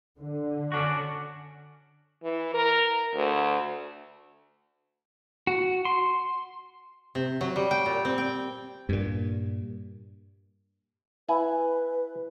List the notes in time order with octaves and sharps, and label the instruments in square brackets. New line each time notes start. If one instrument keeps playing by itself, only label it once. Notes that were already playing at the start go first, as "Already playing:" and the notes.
[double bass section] D3
[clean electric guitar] C#4 D4 F#4
[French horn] E3
A#4
D2
[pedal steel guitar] F#4
C6
[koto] C3
F#3
G3
G5
A#2
C4
G5
[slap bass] G2 A#2
[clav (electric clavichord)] E4 G#5 [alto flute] B4